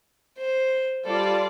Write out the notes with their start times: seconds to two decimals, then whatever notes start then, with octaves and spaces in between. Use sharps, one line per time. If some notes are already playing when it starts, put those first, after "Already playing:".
0.38 C5
1.05 G3 F4 A4 D5